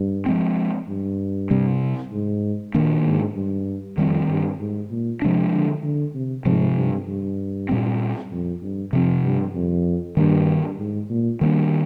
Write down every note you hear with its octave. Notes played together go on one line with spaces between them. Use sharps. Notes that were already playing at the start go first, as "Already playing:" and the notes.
Already playing: G2
F3 G#3 C4
G2
C3 G3 C4
G#2
A#2 D#3 A#3 D4
G#2
G2
F2 D#3 G3 C4
G2
G#2
A#2
C3 F3 G#3 D4
D3
D3
C3
G#2 C3 F3 C4
G2
G2
A#2 G3 C4
F2
G2
F2 C3 F3 C4
G2
F2
G2 D#3 A#3 D4
G#2
A#2
D#3 G3 A#3 D4